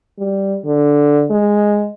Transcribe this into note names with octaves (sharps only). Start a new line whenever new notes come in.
G3
D3
G#3